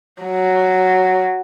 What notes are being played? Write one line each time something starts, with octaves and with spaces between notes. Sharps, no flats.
F#3